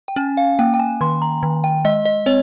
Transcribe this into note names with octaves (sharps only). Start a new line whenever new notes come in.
G5
C#4 G#5
F5
A#3 G5
G5
G#5
D#3 C6
A#5
D#3
G5
G#3 D#5
D#5
C4 C#5